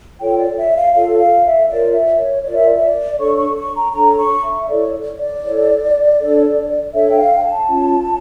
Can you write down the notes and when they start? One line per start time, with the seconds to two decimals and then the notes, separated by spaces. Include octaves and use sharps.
0.19 F4 A4 C#5 G5
0.38 D5
0.57 E5
0.76 F5
0.94 F4 A4 C#5 F5
1.20 F5
1.45 E5
1.69 F4 A#4 C#5 D5
1.94 E5
2.19 C#5
2.44 F4 A#4 C#5 D5
2.55 E5
2.66 D5
2.76 E5
2.86 D5
3.19 D4 A4 C#5 C#6
3.38 C#6
3.57 C#6
3.75 A#5
3.94 D4 A4 C#5 A#5
4.19 C#6
4.44 E5
4.69 E4 A4 C#5 D5
5.19 D5
5.44 E4 A4 C#5
6.19 D4 A4 C#5
6.93 D4 A4 C#5 E5
7.09 G5
7.18 F5
7.34 G5
7.43 A5
7.68 C#4 F4 C#5